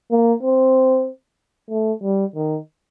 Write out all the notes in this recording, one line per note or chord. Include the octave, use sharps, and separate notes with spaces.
A#3
C4
A3
G3
D#3